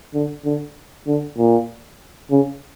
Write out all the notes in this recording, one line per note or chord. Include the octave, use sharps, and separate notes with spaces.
D3
D3
D3
A#2
C#3